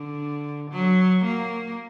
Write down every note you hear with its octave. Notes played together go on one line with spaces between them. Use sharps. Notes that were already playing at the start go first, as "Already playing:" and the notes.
Already playing: D3
F#3
A#3